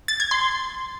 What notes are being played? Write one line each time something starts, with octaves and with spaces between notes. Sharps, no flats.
A6
G#6
C6